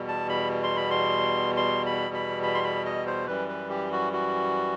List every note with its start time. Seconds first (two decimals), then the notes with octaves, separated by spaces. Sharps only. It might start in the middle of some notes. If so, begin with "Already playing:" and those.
Already playing: E2 B2 G3
0.08 A5
0.29 B5
0.63 C6
0.77 B5
0.91 C6
1.57 C6
1.86 B5
2.14 B5
2.43 B5
2.54 C6
2.64 B5
2.85 D#5
3.07 C5
3.27 F#2 E3 G3 B4
3.49 B4
3.70 G4
3.92 F#4
4.13 F#4